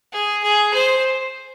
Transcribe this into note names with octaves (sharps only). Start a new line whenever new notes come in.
G#4
G#4
C5